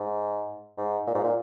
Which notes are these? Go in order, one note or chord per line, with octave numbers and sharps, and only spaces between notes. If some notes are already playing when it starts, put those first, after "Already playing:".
Already playing: G#2
G#2
A#2
G#2
A#2